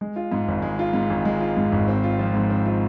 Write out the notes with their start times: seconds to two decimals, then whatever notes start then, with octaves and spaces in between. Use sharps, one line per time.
0.01 G#3
0.16 F4
0.32 G#2
0.48 G#1
0.62 G#3
0.79 F4
0.93 G#2
1.10 G#1
1.25 G#3
1.40 F4
1.57 G#2
1.72 G#1
1.88 C4
2.03 F4
2.19 F3
2.34 G#2
2.50 C4
2.65 F4